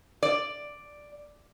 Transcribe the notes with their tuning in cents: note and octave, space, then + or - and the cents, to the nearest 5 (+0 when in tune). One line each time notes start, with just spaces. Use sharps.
D5 +5